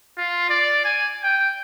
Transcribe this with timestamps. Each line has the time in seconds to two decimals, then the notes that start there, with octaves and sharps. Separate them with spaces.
0.18 F4
0.50 D5
0.84 G#5
1.23 G5